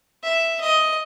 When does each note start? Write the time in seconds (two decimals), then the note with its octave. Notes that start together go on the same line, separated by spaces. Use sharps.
0.23 E5
0.60 D#5